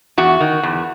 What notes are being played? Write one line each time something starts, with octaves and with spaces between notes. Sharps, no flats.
E2 F#4
D#3
E2